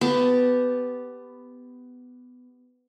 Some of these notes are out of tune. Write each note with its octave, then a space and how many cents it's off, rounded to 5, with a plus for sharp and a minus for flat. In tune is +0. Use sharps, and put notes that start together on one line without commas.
B3 +15 G4 +0 A5 +0